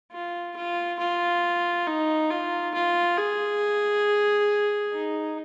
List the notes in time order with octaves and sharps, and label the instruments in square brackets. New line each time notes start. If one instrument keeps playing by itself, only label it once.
[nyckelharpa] F4
F4
F4
D#4
F4
F4
G#4
D#4